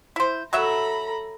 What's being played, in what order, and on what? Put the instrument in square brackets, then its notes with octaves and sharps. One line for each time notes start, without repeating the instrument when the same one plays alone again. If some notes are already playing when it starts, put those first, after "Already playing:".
[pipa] E4 C5
[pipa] F#3 F#4 E5 [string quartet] A4 A#5 B5